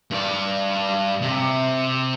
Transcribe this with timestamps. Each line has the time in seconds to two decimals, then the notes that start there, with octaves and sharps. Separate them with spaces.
0.11 G2 D5
1.22 C3